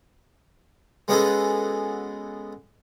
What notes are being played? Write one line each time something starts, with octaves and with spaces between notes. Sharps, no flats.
G#3 B3 C#4 F#4 G#4 A4